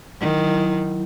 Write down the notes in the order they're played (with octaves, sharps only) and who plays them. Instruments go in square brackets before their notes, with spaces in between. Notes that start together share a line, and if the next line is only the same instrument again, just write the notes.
[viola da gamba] D#3 [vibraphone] F#3 E4